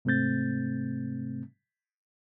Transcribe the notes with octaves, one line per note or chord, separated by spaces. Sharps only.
G#2 C3 A3 C4 G6 A6